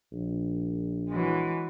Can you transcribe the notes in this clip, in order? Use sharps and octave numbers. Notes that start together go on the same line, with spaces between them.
A#1
E3 F#3 G#3